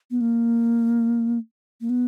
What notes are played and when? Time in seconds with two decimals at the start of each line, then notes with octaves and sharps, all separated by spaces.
0.11 B3
0.21 A#3
1.81 A#3
1.90 B3